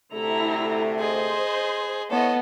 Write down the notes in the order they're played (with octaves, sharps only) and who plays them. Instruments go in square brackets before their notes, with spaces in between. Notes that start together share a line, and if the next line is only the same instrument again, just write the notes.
[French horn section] D2 C3 A3 [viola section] E4 A4 A#5
[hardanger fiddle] G#4 D#5 [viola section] C5
[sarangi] B3 [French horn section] E4 C#5 [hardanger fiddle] A4 D#5